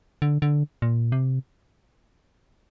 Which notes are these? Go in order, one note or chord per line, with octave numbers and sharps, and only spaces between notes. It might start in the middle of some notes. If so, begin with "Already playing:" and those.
D3
D3
A#2
C3